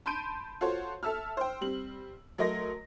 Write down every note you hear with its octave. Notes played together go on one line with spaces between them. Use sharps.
A5 B5 C6 G6 D7 D#7
F4 F#4 A4 C5 C#5
A4 E5 A5 E6 F6
C5 G5
G3 C4 F#7
F#3 A3 A#4 D#5 C6 A#6